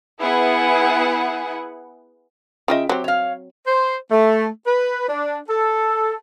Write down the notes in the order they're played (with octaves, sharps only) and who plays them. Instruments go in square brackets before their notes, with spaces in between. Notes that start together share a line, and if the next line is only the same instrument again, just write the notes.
[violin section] B3 E4 G#4 F#5
[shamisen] C#3 F4 D#5 [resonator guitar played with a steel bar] E5 G5
[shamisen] F#3 C4 [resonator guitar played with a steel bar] G4
[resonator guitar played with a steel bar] C#5 F5
[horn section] C5
A3
B4
D4
A4